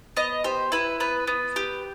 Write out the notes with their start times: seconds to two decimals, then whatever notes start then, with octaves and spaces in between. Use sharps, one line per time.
0.17 B3 D#5
0.44 G4 C5
0.72 E4 B4
1.00 B3 B4
1.27 B3
1.56 G4